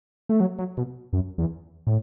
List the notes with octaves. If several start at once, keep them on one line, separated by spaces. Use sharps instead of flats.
A3
F#3
F#3
B2
F#2
E2
A2